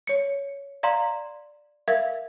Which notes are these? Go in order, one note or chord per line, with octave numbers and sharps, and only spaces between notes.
C#5 C#7
D5 F5 A#5 C6
A#4 E5 F5 G#6